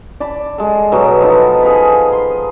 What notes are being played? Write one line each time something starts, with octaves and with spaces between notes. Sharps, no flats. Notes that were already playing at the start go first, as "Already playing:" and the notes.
D5 A5 B5 D6
G#3 A4
B2 F#3 A5
F3 B3 D#4 A4
G#4 F5 G#5 B5
C6